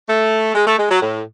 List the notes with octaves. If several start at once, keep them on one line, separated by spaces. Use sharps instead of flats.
A3
G#3
A3
G#3
F#3
A2